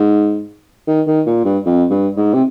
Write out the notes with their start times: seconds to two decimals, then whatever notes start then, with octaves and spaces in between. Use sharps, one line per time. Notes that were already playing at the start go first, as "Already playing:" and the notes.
Already playing: G#2
0.87 D#3
1.07 D#3
1.26 A#2
1.45 G2
1.65 F2
1.90 G2
2.17 G#2
2.34 C3